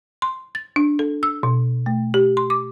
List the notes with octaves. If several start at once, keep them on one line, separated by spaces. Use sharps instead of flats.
C6
A6
D4
A4
E6
B2
A3
G4
C6
D6